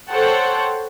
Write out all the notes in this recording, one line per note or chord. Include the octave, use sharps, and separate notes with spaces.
A4 C5 C#5 F#5 G5 A5